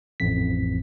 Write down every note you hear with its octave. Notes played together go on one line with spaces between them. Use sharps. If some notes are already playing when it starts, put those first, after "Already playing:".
A1 F2 B6